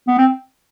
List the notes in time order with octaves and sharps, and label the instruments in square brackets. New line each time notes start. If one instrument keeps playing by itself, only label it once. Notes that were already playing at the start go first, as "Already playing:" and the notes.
[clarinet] B3
C4